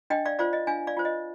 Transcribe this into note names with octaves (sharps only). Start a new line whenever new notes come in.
D4 D#5 G5
D5 F5
F4 C5 D5 F5
D#5
D4 F5 G#5
D5 F5
F4 C5
D#5